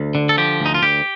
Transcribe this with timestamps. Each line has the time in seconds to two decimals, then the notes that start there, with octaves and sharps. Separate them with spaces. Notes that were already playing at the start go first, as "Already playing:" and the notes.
Already playing: D2
0.15 D3
0.29 A4
0.38 F3 G4
0.60 D2
0.66 D#4
0.74 F4
0.82 D2 G4